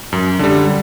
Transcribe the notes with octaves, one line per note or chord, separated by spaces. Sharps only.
F#2
D3 G3